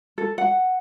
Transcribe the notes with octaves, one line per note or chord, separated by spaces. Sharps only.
A4
F#5